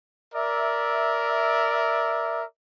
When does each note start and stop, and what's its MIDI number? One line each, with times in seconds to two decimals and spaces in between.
0.35 2.44 70
0.35 2.44 74
0.35 2.44 76